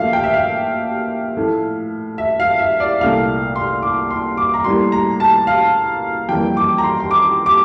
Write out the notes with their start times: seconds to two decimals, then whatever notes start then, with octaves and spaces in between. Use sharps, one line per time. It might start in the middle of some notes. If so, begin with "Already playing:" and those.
Already playing: A#2 F3 A3 E5 F5
0.13 G5
0.24 E5
0.34 F5
1.37 A2 F3 A3
2.18 E5
2.40 F5
2.59 E5
2.80 D5
3.01 C2 A#2 A3 F5
3.56 C6
3.83 D6
4.11 C6
4.37 D6
4.54 A#5
4.64 A2 G3 A#3 C6
4.92 A#5
5.20 A5
5.47 F5
6.29 F2 E3 G3 A#3 G5
6.57 D6
6.78 A#5
6.84 C6
7.00 C6
7.11 D6
7.46 D6